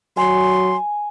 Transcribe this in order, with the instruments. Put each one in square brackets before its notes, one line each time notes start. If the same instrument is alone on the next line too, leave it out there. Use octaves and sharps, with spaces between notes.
[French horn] F#3 [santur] G#5 [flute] C6